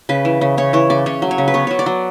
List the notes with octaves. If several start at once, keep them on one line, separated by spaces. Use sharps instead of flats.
C#3 B4
E3
C#3
C#3 C#5
E3 C#5
C#3 D5
C#3 C#5
F#3
C#5
C#3
B4
B3 C#5
F#3 C#5
D5
F#3